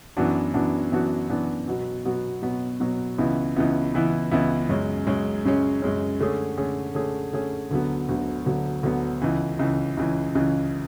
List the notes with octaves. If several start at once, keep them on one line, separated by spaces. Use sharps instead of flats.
F#2 E3 B3 D4 F#4
F#2 E3 B3 D4 F#4
F#2 E3 B3 D4 F#4
F#2 E3 B3 D4 F#4
B2 F#3 B3 F#4
B2 F#3 B3 F#4
B2 F#3 B3 F#4
B2 F#3 B3 F#4
C#2 C#3 E3 B3 E4
C#2 C#3 E3 B3 E4
C#2 C#3 E3 B3 E4
C#2 C#3 E3 B3 E4
F#2 C#3 G#3 C#4
F#2 C#3 G#3 C#4
F#2 C#3 G#3 C#4
F#2 C#3 G#3 C#4
D3 A3 C#4 G#4
D3 A3 C#4 G#4
D3 A3 C#4 G#4
D3 A3 C#4 G#4
D2 D3 F#3 B3
D2 D3 F#3 B3
D2 D3 F#3 B3
D2 D3 F#3 B3
C#2 C#3 E3
C#2 C#3 E3
C#2 C#3 E3
C#2 C#3 E3